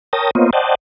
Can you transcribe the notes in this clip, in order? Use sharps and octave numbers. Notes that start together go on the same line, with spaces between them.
A#4 C#5 G5 A5 D#6 A#6
A#3 B3 F4 C5 C#5 D#5
C5 D5 D#5 F#5 G5 A5